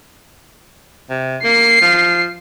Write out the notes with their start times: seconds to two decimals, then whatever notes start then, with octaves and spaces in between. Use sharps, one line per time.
1.10 C3
1.44 A#3 C7
1.81 F3